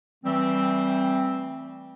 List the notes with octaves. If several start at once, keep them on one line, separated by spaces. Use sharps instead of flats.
E3 G3 A3 C4